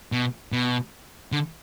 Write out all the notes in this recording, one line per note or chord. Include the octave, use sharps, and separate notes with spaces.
B2
B2
D3